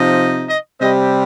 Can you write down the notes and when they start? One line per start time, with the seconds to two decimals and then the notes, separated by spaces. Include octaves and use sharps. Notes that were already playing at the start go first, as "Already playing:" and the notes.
Already playing: C3 F3 D#4
0.47 D#5
0.79 C3 G3 C4 D#5